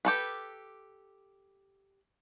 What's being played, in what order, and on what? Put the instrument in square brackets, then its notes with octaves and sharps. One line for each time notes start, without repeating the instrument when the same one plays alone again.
[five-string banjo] G4 A4 B4